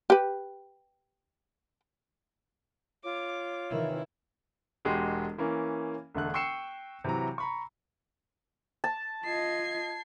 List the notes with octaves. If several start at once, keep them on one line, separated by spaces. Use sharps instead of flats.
G4 B4
F4 C#5 D6
C3 D#3 E3 E4
E1 G#3 F#4 G4 C6
E3 A#3 C#4
E1 D3 A3 F#6
G5 C#6 E6 C7 C#7 E7
C3 E3 F#3 A#5
A#5 B5 C#6
A5
F4 D#5 G#6 C7